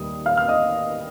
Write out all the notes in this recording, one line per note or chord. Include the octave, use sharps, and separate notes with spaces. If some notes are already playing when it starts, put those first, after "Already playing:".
Already playing: D#2 D#3 G3 A#3 D#6
F5 F6
F6
D#5 D#6